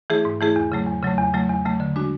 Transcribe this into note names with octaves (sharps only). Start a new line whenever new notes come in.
E3 A3 E4 G#4
G#2
E3 A3 E4 G#4
E2
C#3 F#3 A3
E2
C#3 F#3 A3
E2
C#3 F#3 A3
E2
C#3 F#3 A3
D3
G#3 D4 F#4